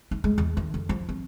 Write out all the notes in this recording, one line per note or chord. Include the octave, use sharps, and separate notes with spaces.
D#4
G#3
E2
D#3
F2
F3
C4